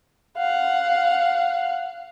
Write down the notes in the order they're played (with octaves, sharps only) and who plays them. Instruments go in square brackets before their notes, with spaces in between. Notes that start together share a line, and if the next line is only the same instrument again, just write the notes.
[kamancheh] F5 F#5